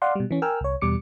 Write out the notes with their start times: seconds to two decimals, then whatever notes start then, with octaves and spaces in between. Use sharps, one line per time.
0.02 D5 F5 F#5 C6
0.15 B2 G3
0.31 E3 C#4
0.42 A#4 G5 G#5 E6 F6
0.61 C2 C#5
0.81 E2 B2 G3 D6 C#7